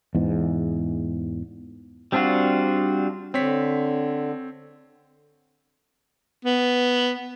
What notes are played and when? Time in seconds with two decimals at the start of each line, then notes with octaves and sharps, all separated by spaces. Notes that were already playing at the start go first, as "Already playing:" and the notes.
0.15 E2 G#2
2.12 G3 C4 D4 F4 F#4
3.34 D3 C4 C#5 B6
6.45 B3